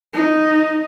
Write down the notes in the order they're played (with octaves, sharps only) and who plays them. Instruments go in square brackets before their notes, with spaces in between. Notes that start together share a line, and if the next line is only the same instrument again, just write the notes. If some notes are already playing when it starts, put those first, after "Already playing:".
[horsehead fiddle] D#4